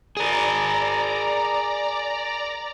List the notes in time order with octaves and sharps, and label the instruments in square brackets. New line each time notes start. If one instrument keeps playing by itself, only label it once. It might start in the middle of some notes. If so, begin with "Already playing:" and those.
[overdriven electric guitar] G#4 A#4 [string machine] D5 A#5